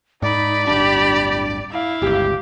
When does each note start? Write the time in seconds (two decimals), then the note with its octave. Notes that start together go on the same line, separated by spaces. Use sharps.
0.22 G#2 D#4 D5 B5
0.67 D1 G1 D4 G4 B5
1.71 E4 F5
2.02 G1 C#2 G4